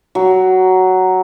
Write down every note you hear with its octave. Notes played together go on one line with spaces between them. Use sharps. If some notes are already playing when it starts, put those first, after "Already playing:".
F#3